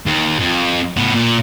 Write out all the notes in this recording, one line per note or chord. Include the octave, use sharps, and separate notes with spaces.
D#2
F2
A2 B3
A#2